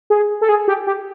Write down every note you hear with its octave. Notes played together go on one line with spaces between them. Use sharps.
G#4
A4
G#4
G4
G4